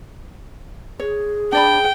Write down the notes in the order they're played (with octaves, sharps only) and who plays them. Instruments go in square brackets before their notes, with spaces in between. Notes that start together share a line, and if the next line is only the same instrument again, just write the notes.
[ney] G#4 [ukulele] C#5
[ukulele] D4 D5 B5 [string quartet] G5